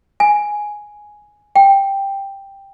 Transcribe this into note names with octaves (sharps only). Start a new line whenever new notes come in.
G#5
G5